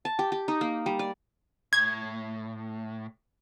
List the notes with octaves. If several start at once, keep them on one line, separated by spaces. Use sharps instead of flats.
A5
G4
G4
D#4
A#3
G3
D5
A2 G#6